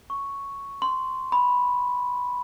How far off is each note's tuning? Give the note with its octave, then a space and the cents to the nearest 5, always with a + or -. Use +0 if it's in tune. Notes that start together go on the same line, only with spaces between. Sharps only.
C#6 +0
C6 -15
B5 -5